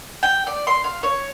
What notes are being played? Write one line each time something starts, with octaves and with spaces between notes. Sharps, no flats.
G5
D5
C6
F5
C#5